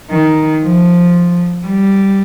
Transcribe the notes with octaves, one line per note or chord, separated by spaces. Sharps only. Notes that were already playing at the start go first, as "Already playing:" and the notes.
D#3
F3
G3